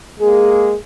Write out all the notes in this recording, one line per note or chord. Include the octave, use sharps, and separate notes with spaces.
G#3 A#3 G#4